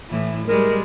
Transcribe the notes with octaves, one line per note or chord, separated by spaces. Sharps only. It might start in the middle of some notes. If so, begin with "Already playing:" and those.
A2 E3
G3 G#3 A#4